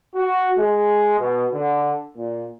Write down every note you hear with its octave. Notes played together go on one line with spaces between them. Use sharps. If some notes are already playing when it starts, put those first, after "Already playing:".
F#4
G#3
B2
D3
A#2